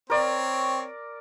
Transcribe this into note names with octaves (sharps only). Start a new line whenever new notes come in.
C4 A#4 C#5 D5